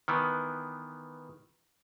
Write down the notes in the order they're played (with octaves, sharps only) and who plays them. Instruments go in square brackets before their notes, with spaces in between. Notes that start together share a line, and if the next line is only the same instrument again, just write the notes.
[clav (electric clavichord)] D#3 E3 B3